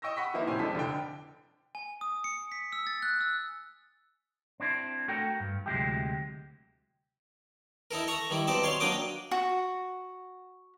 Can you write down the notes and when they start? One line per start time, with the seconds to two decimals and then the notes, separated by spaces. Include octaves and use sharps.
0.02 D#5 G5 C#6 E6 A#6
0.16 F#5 B5 C#6 B6
0.34 D#3 F3 A#3 E4 B4
0.47 F1 A2 C4 C#4 G4 G#5
0.59 F2 G#3 D4 A4 B6
0.75 F1 D3 G5
1.75 G#5
2.01 D#6
2.24 C#7
2.52 B6
2.72 E6
2.87 A6
3.02 F#6
3.21 E6
4.60 C4 D4 E4
5.08 A3 F#4 A4 A#4 F#5 G5
5.40 G2
5.66 D2 C3 F#3 G#3 E4 G4
7.91 D#4 E4 A4 A#4
8.07 A4 A#5 C#6
8.30 D#3 G3 E4
8.47 B1 C4 D#4 D5 A5
8.63 C#5 F5 C6
8.80 F#3 A#3 D4 D#5 G5 D6
9.31 F#4